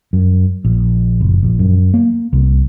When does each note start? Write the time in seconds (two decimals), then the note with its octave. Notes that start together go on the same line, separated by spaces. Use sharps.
0.13 F#2
0.65 A#1
1.21 F#1
1.43 A#1
1.59 F#2
1.94 A#3
2.33 C2